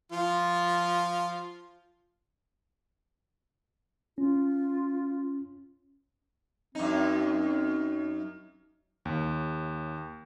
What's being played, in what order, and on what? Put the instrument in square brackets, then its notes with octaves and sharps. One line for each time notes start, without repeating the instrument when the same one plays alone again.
[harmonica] F3 F4
[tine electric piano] C#4 [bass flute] F4
[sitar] F#2 D#4 [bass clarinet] C4
[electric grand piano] D#2